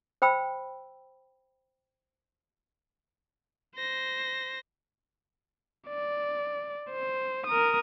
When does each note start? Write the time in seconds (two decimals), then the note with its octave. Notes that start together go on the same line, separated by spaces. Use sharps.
0.22 C5 G5 B5 E6
3.76 C5 A#6
5.89 D5
6.91 C5
7.47 A#4 D#6